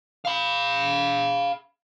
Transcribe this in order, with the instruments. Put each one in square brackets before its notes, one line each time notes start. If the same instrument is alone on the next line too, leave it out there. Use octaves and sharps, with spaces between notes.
[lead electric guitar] F5 B5